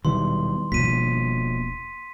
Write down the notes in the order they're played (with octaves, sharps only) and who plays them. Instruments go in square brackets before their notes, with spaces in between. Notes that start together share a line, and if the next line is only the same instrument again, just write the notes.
[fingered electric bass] D#1 B2 F#3 [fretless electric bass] D#3 E3 G3 [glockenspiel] C6
[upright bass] E1 A#3 [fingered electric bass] B2 F3 [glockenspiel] B6 D#7